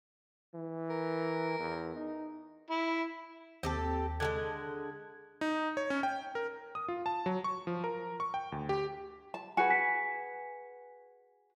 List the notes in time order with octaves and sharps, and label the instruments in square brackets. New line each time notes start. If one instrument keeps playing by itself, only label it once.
[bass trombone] E3
[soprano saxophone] A#4
[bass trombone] E2
D#4
[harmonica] E4
[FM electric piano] D#2 [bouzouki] C4 G4 A4
[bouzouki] D3 G3 G#3 [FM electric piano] A4 F#6 G#6
[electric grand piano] D#4
C#5
C#4
G5
A#4
D#6
F4
A5
F#3
C#6
F3
A#4
C#6
G5
D2
G4
[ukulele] A5
[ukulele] F#4 G#4 B4 [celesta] G#5 C#7
[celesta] G#5 B6 C#7